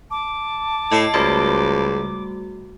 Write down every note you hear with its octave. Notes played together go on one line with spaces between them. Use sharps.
A5 D6
A2 D#5 C7
C#2 G3 A3 F#4